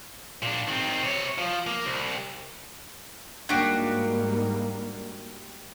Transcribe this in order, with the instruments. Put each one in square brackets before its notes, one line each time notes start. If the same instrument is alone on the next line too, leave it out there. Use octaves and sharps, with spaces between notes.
[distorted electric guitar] A#2 D4
D#3 C4
C3 C#5
F3
A#3
C2
[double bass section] G#2 G3 A#3 [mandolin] D4 F#4 G4